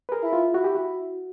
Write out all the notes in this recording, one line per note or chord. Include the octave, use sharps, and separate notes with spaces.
B4
G#4 A#4
E4
F4
E4 F#4
G4
F#4